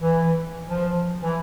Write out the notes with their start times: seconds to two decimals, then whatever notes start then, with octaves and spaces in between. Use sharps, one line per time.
0.02 E3
0.68 F3
1.23 E3